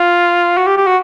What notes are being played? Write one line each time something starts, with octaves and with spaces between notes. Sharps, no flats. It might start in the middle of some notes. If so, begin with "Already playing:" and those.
Already playing: F4
F#4
G4
G4
F#4